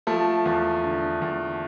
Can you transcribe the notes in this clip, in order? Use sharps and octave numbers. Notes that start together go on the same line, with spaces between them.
F3 A3
E2
D3
E2